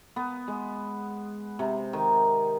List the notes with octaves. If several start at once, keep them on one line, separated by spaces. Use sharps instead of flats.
B3
G#3
C3
D#3